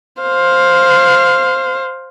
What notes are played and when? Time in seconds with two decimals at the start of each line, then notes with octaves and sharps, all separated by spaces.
0.22 C5 F5